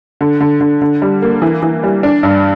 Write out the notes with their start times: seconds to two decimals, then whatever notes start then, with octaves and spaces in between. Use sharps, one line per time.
0.21 D3
0.40 D3
0.61 D3
0.82 D3
1.02 G3
1.22 A#3
1.42 E3
1.62 E3
1.83 G3
2.03 D4
2.23 G2